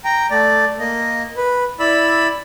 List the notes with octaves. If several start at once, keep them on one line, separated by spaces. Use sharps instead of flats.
G5 A#5
A3 D5
A#3 D#5
B4
E4 D5 B5 E6